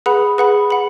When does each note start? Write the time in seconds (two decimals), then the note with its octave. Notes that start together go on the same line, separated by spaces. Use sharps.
0.06 G#4 B4 F#5 B5
0.38 G#4 B4 F#5 B5
0.70 F#5 B5